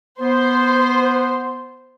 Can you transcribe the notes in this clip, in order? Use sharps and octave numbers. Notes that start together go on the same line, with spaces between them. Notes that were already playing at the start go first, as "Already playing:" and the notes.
B3 C5